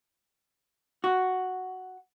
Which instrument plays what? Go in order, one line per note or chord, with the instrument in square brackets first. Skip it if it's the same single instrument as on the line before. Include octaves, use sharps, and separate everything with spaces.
[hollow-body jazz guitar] F#4